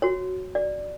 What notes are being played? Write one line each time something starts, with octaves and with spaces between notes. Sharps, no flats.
F#4 C#5
D5